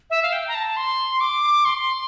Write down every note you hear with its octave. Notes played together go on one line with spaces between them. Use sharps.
E5
F5
G5
A#5
A5
C6
D6
C6